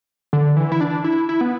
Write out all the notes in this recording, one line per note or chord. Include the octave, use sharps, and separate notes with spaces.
D3
E3
E4
D4
E4
E4
B3